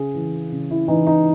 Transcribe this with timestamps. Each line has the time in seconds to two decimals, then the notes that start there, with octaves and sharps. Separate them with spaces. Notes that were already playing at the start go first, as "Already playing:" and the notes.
Already playing: C#3 G#4
0.14 E3
0.52 C#3
0.70 E4
0.88 E3 D#4
1.07 D#4